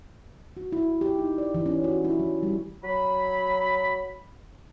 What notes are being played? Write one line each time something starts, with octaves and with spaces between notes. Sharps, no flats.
F#4
E4
G4
D#4
D5
E3
C#4
F#4
E4
F#3
G3
F#3 B5